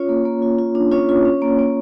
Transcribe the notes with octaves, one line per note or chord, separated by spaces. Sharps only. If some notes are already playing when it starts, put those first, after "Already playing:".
Already playing: C#4 F4 C#5
A#3
A#3
F4
F4
D4
C#4 F4 C#5
F4
C#4
A#3
A#3